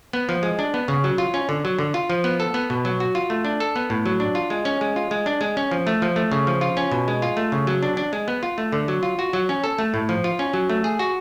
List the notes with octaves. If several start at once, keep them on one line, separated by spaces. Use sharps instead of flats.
B3
F3
G#3
D4
B3
C#3
F#3
F4
C#4
D3
F#3
D3
F4
F3
B3
A4
B3
B2
F#3
F#4
F4
A3
D4
A4
B3
A2
F#3
D4
F4
G#3
C#4
G#3
F4
G#3
D4
G#3
C#4
F3
A3
F3
A3
C#3
F3
F4
C#4
B2
G#3
F4
A3
C#3
F#3
D4
D4
G#3
B3
F4
A3
D3
F#3
F4
F#4
F#3
C#4
A4
A3
A2
F3
F4
C#4
F#3
A3
G#4
F#4